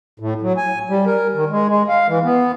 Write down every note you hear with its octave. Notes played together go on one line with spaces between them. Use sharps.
A2
F#3
G#5
G3
A#4
D#3
G#3
G#3
F5
E3
B3